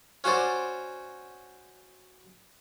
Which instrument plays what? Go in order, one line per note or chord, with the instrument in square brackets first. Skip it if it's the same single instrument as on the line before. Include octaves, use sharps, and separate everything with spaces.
[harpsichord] C#4 F#4 C5 D5